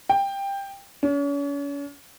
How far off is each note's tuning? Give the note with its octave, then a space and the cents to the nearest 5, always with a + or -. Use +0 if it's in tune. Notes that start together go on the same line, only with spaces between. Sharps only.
G5 +15
C#4 +40